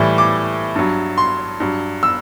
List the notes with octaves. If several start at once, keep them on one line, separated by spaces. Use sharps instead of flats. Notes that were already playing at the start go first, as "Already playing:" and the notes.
Already playing: A2 E3 G3
D6
G2 F#3
C6
G2 F#3
E6